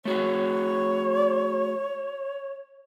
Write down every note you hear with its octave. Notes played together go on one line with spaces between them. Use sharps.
A3 F#4 G#4 C#5